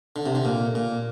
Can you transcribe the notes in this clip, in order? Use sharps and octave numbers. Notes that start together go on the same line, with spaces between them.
D3
C3
D3
A#2
A#2